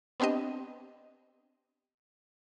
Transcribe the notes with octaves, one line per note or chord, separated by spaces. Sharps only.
B3 C4 D4 G4 D#5